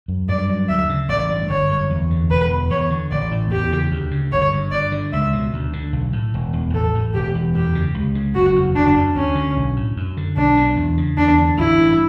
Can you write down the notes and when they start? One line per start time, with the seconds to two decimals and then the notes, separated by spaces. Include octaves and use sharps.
0.08 F#2
0.29 G2 D5
0.49 F#3
0.69 D2 E5
0.89 C#3
1.09 A1 D5
1.29 G2
1.49 G1 C#5
1.69 F#2
1.90 E2
2.10 D3
2.31 E1 B4
2.50 E2
2.70 E2 C#5
2.90 D3
3.11 A1 D5
3.31 A2
3.51 E2 G4
3.72 C#3
3.91 D2
4.11 C#3
4.32 G1 C#5
4.52 G2
4.72 G2 D5
4.92 D3
5.13 C#2 E5
5.33 B2
5.53 D2
5.73 D3
5.93 B1
6.13 A2
6.34 E1
6.53 E2
6.73 A1 A4
6.95 A2
7.14 E1 G4
7.35 E2
7.54 F#2 G4
7.75 C#3
7.94 C#2
8.15 C#3
8.35 F#1 F#4
8.56 E2
8.75 F#1 D4
8.96 F#2
9.15 D2 C#4
9.35 D3
9.57 B1
9.76 A2
9.97 F#2
10.17 D3
10.37 B1 D4
10.57 B2
10.76 E2
10.97 C#3
11.18 E2 D4
11.38 D3
11.58 A1 E4
11.78 G2